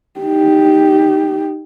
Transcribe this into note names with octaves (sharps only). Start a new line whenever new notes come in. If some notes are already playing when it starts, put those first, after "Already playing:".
D#4 G4